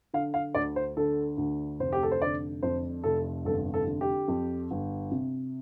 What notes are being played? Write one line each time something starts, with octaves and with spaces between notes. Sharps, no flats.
D3 F5
F5
D2 D5
C5
D3 A4
D2
F1 C5
G4
A4
C5
D3 D5
F2 C5
F1 A4
G1 A4
A4
D3
G4
F2
G1
C3